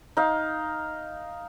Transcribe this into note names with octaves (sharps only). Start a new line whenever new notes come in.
D#4 F5